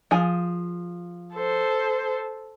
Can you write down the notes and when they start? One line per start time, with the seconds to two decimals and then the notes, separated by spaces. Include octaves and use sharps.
0.11 F3 G#4 G#5
1.34 A4 C5